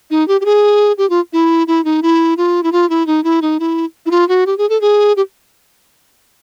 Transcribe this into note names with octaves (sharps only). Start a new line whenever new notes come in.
D#4
G4
G4
G#4
G4
F4
E4
E4
D#4
E4
F4
E4
F4
E4
D#4
E4
D#4
E4
E4
F4
F#4
G4
G#4
A4
G#4
G4